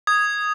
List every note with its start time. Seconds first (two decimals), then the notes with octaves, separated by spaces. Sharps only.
0.07 D#6 G#6